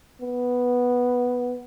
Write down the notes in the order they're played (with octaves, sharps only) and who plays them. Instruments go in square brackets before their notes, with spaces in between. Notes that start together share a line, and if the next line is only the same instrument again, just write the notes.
[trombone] B3